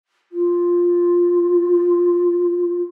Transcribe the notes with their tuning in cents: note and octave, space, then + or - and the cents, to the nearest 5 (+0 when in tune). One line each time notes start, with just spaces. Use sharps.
F4 +5